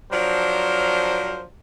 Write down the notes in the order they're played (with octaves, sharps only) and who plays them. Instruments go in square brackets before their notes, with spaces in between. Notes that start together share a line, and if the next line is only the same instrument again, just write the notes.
[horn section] F3 F#3 D4 A#4 C5